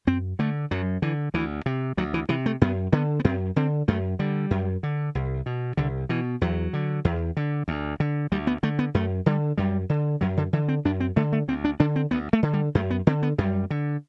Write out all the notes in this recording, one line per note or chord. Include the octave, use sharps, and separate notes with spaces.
F#2 C4
D3 A3
F#2 F#3
D3 E3
D2 E3
C3
D2 F#3
E3
C3 E3
A3
F#2 B3
D3 B3
B3
F#2 C4
D3 C4
F#2 A3
D3 G3
F#2
D3
C2
B2
C2 D3
B2 E3
E2 F#3
D3
E2
D3
D2
D3
D2 G3
B3
D3 A3
B3
F#2 A3
D3 G3
F#2 G3
D3
F#2 F#3
D3
D3 E3
C4
F#2 D4
C4
D3 A3
A3
D2 C4
D4
D3 D4
C4
D2 B3
A3
D3
G3
F#2 A3
B3
D3 C4
B3
F#2 G3
D3